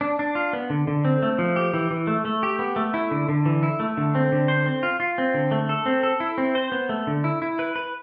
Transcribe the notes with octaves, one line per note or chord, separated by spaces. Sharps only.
D4
D4
F4
B3
D3
D3
C4
A3
F3
G4
E3
E3
A3
A3
G4
B3
A3
E4
D3
D3
E3
E4
A3
D3
C4
D3
C5
C4
F4
F4
C4
D3
A3
A4
C4
A4
E4
C4
C5
B3
A3
D3
E4
E4
B4
B4